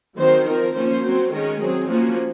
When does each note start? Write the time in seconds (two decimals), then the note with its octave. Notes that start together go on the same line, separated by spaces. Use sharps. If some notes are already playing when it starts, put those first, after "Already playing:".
0.18 D#3 F#3 C4 C5
0.47 F3 C4 A#4
0.75 F3 A#3 C#4 C5
1.04 F#3 C4
1.32 D#3 G#3 C#4 A#4
1.61 F#3 C4 G#4
1.89 F3 A#3 C#4 F#4